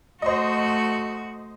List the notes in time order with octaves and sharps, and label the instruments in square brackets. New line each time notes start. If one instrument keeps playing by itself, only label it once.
[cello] A3 F#4 [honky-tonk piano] C5 D#5